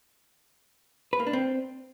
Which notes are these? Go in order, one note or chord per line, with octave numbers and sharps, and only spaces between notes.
B4
A#3
D4
C4